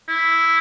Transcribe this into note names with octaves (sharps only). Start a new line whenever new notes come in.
E4